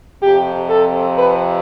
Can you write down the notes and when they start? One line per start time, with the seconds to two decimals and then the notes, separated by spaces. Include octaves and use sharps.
0.21 F2 C3 F3 G4
0.69 A4
1.16 B4